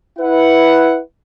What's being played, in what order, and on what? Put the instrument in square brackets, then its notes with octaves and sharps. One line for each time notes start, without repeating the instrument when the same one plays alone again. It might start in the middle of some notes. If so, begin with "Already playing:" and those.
[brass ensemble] E4 B4 F#5